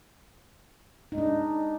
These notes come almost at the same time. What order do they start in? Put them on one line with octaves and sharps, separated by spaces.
D#4 G#3 D4